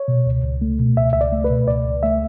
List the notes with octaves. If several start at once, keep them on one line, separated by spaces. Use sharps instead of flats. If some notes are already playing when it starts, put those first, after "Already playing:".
Already playing: C#5
B2
C#2
C#2
A3
B2
C#2 E5
C#2 E5
D5
A3
B4
B2
C#2 D5
C#2
A3 E5